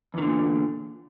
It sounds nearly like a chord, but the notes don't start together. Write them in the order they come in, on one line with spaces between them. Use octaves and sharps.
E2 D#3 D3 A#2